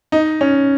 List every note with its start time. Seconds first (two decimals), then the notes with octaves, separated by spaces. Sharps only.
0.12 D#4
0.41 C#4